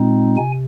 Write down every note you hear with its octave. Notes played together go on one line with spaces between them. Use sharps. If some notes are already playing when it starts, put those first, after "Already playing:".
Already playing: A#2 G#3 C4 D#4
C3 G#5